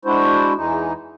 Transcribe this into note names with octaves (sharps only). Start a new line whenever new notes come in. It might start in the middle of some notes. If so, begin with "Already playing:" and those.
G#3 D4 E4 F#4 C5
E2 E3 G#3 D#4